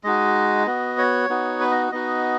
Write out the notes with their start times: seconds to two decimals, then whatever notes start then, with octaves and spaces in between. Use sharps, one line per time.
0.04 G#3 D#4 F#4 D#5
0.66 B3 F#4
0.98 C#5
1.30 B3 D#4 F#4
1.60 B4
1.71 D#5
1.92 B3 D#4 F#4 D#5